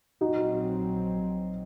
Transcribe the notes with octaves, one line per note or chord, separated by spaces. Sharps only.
A#1 A#2 F#3 C4 D#4 F#4